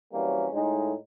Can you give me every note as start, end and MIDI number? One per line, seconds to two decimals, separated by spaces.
0.13 0.46 52
0.13 0.46 54
0.13 0.46 55
0.13 0.46 58
0.13 0.46 60
0.13 0.46 61
0.52 0.92 45
0.52 0.92 56
0.52 0.92 63